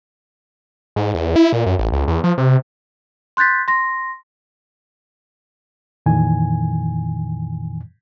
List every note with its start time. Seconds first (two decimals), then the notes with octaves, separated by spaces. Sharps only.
0.96 G#2
1.14 E2
1.36 E4
1.53 A#2
1.66 F#2
1.79 A1
1.92 C#2
2.08 E2
2.24 F3
2.38 C3
3.37 C6 F#6 G6 A6 B6
3.68 C6 A#6
6.06 F2 A#2 D#3 E3 G#5